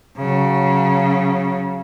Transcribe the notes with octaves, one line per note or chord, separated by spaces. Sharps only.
C#3 F#3